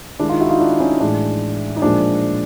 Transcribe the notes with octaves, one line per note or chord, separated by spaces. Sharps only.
D#3 G#3 D4 E4
D#4 F4
E4 F#4
D#4 F4
D4 E4
C#4 D#4
A2 E3 G#3 D4
D#4
A#2 F3 G#3 D4